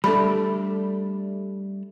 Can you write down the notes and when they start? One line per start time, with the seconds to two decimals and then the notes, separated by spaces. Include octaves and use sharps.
0.04 G3 A3 D4 A4 B5